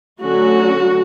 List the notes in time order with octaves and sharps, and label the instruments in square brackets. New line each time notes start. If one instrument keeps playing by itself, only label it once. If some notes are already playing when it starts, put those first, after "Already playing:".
[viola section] D3 F#3 A3 C#4 F#4